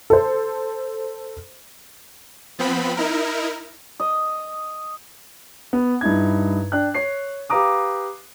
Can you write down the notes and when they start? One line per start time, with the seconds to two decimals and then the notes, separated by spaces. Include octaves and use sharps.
0.10 A4 C5
2.59 F3 B3 C4 B5
2.97 D#4 E4 A#4
4.00 D#5
5.73 B3
6.01 G2 D#4 E4 G#6
6.72 D4 G5 F#6
6.94 C#5 C7
7.50 G4 B4 F5 A#5 D6 D#6